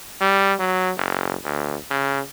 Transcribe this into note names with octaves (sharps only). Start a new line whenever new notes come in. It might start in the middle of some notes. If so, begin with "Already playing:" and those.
G3
F#3
F#1
D2
C#3